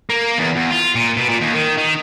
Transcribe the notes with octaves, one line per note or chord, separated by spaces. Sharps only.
A#3
E2
E2
F4
A#2
B2
A#2
D#2
D#3
D#3